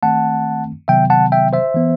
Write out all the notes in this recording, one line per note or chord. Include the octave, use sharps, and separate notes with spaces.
D#3 A3 C4 F#5 A5
C3 D#3 F#3 B3 E5 G5
F#5 A5
E5 G5
C5 E5
E3 B3